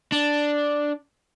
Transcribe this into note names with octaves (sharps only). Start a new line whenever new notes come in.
D4